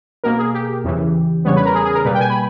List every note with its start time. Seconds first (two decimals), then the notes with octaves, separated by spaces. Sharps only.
0.24 B2 A#3 A#4
0.39 G#4
0.54 G4
0.84 E2 C#3 E3
1.45 E2 C#3 G3 B3 C#5
1.56 B4
1.65 A#4
1.75 G#4
1.85 G#4
1.95 A#4
2.05 B2 G3 A#3 B4
2.15 G5
2.20 G#5
2.30 B5